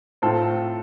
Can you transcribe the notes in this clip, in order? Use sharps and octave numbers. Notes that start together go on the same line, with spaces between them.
A2 A3 C4 F4 A4